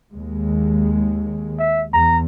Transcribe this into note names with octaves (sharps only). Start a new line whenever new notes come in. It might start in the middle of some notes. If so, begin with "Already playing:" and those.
D#2 G#3
E5
E2 A#5